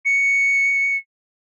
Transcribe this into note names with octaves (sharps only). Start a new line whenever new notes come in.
C#7